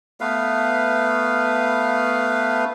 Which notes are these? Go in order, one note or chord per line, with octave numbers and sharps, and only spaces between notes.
A3 B3 B4 F5